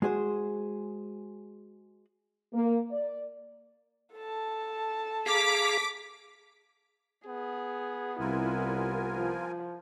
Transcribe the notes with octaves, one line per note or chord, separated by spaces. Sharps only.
G#3 F#4 G#4 C5
A#3
D5
A4 A5
G#4 F5 A#5 D6 B6
B3 G#4
C2 E4 F4 A#4 G#5
F3